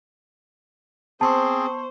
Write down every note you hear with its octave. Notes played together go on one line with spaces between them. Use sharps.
B3 C4 G#4 C5 A5 C6 C#6